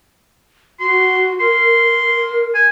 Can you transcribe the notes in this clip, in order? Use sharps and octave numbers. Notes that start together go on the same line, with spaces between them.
F#4 C6
A#4 C6
G#5